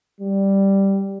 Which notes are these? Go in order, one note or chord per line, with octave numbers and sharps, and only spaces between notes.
G3